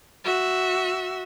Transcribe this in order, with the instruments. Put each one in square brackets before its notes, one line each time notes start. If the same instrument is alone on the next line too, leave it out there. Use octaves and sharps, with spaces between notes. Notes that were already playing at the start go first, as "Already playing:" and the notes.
[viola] F#4 E5